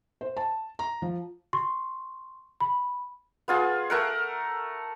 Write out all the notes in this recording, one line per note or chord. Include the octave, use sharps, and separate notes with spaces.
C5
A5
A#5
F3
C6 C#6
B5
B3 F4 G#4
A3 A#4 F#5